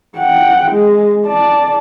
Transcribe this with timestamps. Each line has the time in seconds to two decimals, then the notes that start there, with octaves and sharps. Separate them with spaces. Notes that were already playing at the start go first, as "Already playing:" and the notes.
0.17 F#5 G5
0.71 G#3
1.27 D5 A5